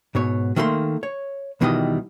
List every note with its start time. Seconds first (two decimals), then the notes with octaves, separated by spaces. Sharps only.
0.15 G#2 B2 C#5
0.56 D#3 A3 A#3 G#4 C6
1.03 C#5
1.61 B1 B2 D#3 E3 G3 D#5